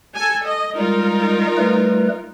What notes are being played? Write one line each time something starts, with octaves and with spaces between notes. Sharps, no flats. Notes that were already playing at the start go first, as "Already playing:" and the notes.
A4 G#5
D#5
G3 G#3 D#4 F4 A#4
G3 A3 B4